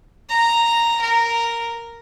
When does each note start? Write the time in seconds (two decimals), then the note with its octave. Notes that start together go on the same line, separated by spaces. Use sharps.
0.29 A#5
1.01 A#4